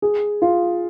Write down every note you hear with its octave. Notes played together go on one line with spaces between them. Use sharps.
G#4
F4